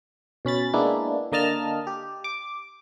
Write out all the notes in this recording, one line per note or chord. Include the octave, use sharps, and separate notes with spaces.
B2 C#4 B5 A6
G#3 A#3 B3 D4 E4
D3 A#3 D#5 A5 F6
G4
D6